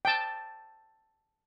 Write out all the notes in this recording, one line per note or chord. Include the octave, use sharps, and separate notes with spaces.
G5 A5